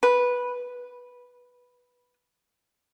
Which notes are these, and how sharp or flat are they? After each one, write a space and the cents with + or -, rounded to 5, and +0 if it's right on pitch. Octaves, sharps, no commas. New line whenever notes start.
B4 -10